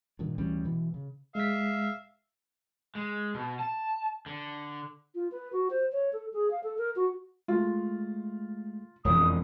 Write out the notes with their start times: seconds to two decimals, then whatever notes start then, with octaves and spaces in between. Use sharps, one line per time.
0.19 G2 A#2 D#3
0.38 D2 E3 G3 C#4
0.64 B2 E3
0.94 C#3
1.35 G#3 E5 F5 B6
2.95 G#3
3.34 B2
3.59 A5
4.26 D3
5.15 F4
5.31 B4
5.52 F#4
5.70 C5
5.92 C#5
6.13 A4
6.33 G#4
6.51 F5
6.63 A4
6.78 A#4
6.96 F#4
7.48 G#3 A3 F4
9.05 E1 F2 E3 D#6